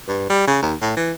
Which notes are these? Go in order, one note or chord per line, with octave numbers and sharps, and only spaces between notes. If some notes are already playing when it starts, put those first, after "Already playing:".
G2
G3
C#3
D#2
A2
E3